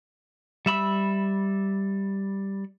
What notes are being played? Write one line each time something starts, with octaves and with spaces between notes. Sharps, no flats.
G3 E5 B5 E6